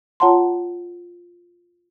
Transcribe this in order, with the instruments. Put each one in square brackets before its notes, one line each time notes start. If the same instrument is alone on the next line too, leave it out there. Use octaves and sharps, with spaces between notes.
[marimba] F4 C#5 F#5 A5 A#5 C6